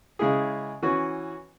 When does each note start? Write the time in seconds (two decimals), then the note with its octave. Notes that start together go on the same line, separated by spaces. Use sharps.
0.19 C#3 G#3 E4 G#4
0.83 E3 C#4 F#4